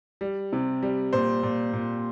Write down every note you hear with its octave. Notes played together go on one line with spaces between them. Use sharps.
G3
C3
G3
A#2 C5
A#2
A#2